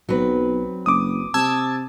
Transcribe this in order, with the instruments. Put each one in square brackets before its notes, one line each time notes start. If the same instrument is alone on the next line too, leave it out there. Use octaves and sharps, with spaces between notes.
[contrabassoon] B1 [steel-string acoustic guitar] F#3 C4 B4
[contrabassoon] F#1 [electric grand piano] D6 D#6
[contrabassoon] C3 [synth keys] A5 E6 G#6